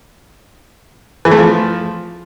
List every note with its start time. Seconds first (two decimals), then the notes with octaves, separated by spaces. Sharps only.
1.25 E3
1.31 A3
1.38 F3